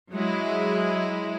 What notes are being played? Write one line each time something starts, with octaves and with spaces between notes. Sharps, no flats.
F#3 G#3 E4